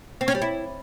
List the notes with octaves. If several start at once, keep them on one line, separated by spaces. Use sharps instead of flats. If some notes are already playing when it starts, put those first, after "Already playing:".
C4
C#4
G3
E4